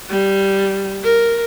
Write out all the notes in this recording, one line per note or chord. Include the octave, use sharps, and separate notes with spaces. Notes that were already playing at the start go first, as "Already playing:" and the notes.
G3
A#4